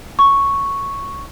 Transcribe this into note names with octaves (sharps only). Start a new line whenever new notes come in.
C#6